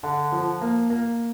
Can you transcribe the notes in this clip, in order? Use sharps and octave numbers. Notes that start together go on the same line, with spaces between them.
D3
F3
A#3
A#3